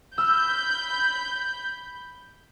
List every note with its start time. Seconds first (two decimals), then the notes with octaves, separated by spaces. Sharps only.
0.18 B5 E6 F6 G6